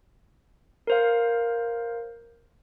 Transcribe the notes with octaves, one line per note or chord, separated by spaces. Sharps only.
A#4 C5 F5